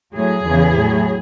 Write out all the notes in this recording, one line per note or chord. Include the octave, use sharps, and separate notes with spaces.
A2 F#3 G#4
E2 C#3 E3
A2 F#3